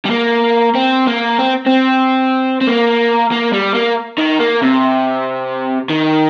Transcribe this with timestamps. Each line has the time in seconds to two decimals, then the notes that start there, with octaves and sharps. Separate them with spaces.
0.05 G3
0.10 A#3
0.75 C4
1.07 A#3
1.39 C4
1.67 C4
2.61 C4
2.67 A#3
3.32 A#3
3.53 G3
3.74 A#3
4.18 D#3
4.39 A#3
4.62 C3
5.90 D#3